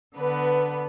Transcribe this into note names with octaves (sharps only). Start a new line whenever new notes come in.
D3 B3 B4